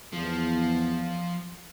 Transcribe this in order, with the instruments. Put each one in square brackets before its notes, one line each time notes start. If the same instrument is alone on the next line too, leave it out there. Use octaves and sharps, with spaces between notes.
[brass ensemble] E2 [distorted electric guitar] F3